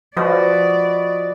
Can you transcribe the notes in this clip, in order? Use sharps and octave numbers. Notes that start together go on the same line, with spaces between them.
F3 F#4 B4 D5 D#5